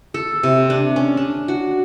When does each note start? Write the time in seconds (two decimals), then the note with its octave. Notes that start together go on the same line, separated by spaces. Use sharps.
0.14 A4
0.43 C3
0.70 D4
0.96 C#4
1.17 D4
1.48 F#4